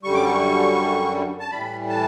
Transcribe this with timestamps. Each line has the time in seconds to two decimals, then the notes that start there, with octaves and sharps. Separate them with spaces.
0.03 F#2 D3 G3 C#6
0.15 D6
0.25 C#6
1.40 A5
1.51 A2 E3 G3 B5
1.89 A5